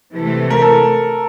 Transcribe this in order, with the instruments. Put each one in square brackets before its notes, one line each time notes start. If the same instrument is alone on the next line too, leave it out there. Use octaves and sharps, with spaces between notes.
[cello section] C3 E3 A3
[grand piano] A#4
A4